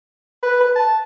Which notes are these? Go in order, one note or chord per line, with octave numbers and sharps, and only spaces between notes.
B4
B4
A5